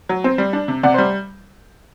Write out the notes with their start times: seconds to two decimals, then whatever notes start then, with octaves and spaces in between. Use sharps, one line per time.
0.09 F#3
0.24 C4
0.38 G3
0.53 D4
0.68 C3
0.83 C3 D5 F#5
0.94 G3 C5